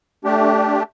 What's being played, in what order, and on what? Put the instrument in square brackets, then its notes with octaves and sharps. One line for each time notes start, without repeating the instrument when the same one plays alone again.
[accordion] A3 D4 G4